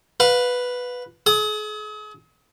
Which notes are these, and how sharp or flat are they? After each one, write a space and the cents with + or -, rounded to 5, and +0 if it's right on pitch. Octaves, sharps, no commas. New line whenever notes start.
B4 +0 F5 +35
G#4 +40 D#6 -20